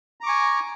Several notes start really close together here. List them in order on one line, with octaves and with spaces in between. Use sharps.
A#5 D6 C#6 G#5